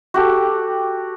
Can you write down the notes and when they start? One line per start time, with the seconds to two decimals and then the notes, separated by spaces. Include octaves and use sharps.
0.14 F#4 G4 A4